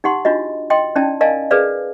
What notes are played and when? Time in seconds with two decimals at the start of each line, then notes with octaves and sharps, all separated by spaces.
0.04 D#4 G4 F#5 C6
0.25 D4 F4 F#4 D#5
0.70 D#5 G5 C6
0.96 C#4 D#4 E4 D5 G5 A5
1.21 A#4 D5 D#5 F5 G#5 A5
1.51 G#4 A#4 B4 D5 F5